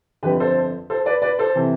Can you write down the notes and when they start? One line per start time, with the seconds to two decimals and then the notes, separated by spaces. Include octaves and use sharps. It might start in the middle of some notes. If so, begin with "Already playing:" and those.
0.23 G1 F2 D3 G4 B4
0.40 A4 C5
0.90 A4 C5
1.06 B4 D5
1.22 B4 D5
1.39 A4 C5
1.55 C3 E3